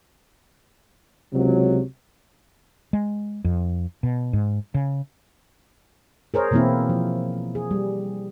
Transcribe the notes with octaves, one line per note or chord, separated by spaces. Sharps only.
C#2 C3 F#3
G#3
F2
B2
G#2
C#3
G#4 A#4 C5 C#5
B2 E3 A#3 C4 E4
F3
G#4
G3